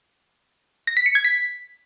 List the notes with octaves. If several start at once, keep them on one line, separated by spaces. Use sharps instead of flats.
A#6
B6
C#7
G#6
B6